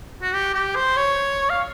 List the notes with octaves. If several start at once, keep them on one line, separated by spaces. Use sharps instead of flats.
F#4
G4
G4
C5
C#5
F5